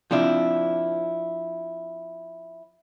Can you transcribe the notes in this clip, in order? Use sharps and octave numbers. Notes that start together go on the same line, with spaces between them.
F3 C4 D4 E4